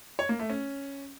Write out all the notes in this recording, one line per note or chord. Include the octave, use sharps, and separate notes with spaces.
C#5
A#3
A3
C#4